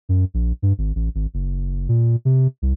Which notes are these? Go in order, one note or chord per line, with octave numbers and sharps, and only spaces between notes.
F#2
A#1
G2
G#1
A1
G#1
F#1
A#2
C3
C2